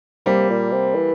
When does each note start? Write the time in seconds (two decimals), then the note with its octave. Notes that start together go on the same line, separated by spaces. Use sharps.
0.26 C3 G3 A#3
0.50 A#2
0.72 C3
0.95 E3